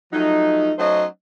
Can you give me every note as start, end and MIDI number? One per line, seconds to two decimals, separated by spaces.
0.13 0.72 53
0.13 0.72 54
0.13 0.72 57
0.13 0.72 63
0.78 1.05 54
0.78 1.05 57
0.78 1.05 61
0.78 1.05 63
0.78 1.05 72
0.78 1.05 75